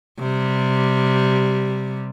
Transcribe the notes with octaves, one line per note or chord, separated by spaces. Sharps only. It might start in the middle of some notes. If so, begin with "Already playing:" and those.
C3 G3